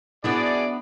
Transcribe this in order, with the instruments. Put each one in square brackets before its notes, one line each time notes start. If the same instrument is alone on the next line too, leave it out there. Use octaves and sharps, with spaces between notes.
[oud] B3 D4 E4 [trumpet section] F#4 G#4 D5